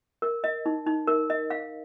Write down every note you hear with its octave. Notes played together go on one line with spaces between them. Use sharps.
A#4
D#5
D#4
D#4
A#4
D#5
F5